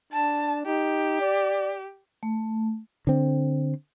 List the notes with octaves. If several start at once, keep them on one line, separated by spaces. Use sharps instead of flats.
D4 A5
D#4 G4
D5
A3
D3 C4